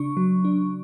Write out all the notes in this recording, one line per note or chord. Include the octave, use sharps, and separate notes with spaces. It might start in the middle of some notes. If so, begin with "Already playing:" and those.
Already playing: C#3 D4 C#6
F#3
D4